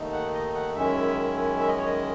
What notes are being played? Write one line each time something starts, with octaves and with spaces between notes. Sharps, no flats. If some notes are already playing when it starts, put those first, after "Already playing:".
Already playing: D#2 D#3 A3 D#4
F#5
D#5
F#5
F#2 D#3 G#3 C#4 E4 E5
E5
D#5
C#5
D#5